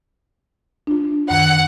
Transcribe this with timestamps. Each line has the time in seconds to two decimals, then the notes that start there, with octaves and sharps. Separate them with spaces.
0.87 D4 F4
1.30 F#2 D#3 F#5